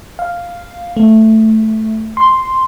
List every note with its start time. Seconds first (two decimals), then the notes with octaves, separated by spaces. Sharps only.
0.19 F5
0.97 A3
2.17 C6